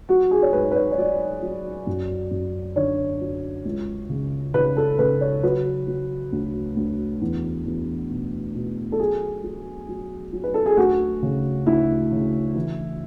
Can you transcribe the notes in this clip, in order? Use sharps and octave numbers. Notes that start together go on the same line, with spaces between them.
F#3 F#4
G#4
C#5
G#2 B4
B4
C#5
C#5
F#3 D5
F#3
F#2
F#2
D3 C#5
F#3
C#2
C#3
C#3 B4
A4
C#3 B4
C#5
F#3 B4
F#3
D2
D2
E2
E2
B2
B2
A4
F#3 G#4
F#3
F#3
F#3
B4
A4
G#4
D2 F#4
C#3
D2 E4
C#3
E3